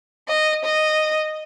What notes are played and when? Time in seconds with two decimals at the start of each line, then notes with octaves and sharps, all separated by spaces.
0.28 D#5
0.65 D#5